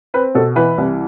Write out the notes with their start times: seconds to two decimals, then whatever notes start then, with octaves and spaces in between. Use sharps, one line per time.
0.14 C4 B4
0.35 B2 A4
0.56 E3 B4
0.78 C2